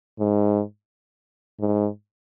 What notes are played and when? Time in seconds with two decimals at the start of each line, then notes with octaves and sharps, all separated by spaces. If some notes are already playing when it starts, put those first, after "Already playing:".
0.19 G#2
1.59 G#2